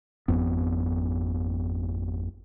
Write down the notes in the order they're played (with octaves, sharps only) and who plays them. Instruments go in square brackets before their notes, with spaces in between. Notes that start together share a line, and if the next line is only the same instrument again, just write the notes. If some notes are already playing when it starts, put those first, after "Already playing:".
[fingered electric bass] G#1 F2 B3